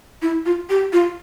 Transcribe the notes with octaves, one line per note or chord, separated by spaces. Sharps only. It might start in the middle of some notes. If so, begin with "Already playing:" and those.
E4
F4
G4
F4